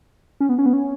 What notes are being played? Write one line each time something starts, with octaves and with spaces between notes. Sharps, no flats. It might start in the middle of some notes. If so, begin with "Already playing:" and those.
C#4
B3
C#4
B3
C#4